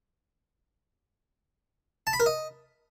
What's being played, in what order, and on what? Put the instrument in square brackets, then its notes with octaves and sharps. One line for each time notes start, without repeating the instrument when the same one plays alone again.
[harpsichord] A5
B5
A#4
D#5